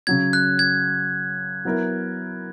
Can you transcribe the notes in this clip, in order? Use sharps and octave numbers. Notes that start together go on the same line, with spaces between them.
C#3 F#3 C#4 G#6
F#6
G#6
F#3 B3 E4 A#4